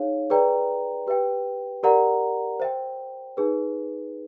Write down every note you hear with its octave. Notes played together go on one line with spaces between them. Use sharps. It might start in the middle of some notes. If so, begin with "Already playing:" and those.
Already playing: D#4 G#4 C#5 F5
G#4 B4 D5 G5 A#5
G4 B4 E5 G5
G4 A#4 D5 F#5 A#5
C5 E5 G5
D#4 G#4 B4